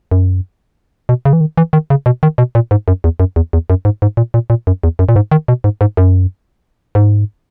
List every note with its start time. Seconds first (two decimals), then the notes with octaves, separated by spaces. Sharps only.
0.11 F#2
1.09 B2
1.25 C#3
1.33 E3
1.41 D#3
1.57 E3
1.73 D#3
1.90 C#3
2.06 B2
2.23 D#3
2.38 B2
2.55 A#2
2.71 G#2
2.88 F#2
3.04 E2
3.20 F#2
3.36 E2
3.53 E2
3.70 F#2
3.85 G#2
4.02 G#2
4.17 A#2
4.34 A#2
4.50 A#2
4.67 F#2
4.84 E2
4.99 F#2
5.09 A#2
5.16 G#2
5.31 D#3
5.48 B2
5.64 G#2
5.81 G#2
5.97 F#2
6.95 G#2